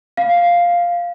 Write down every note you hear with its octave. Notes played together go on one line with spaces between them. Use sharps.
F5